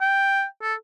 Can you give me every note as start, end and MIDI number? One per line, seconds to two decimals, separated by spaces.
0.01 0.44 79
0.62 0.74 69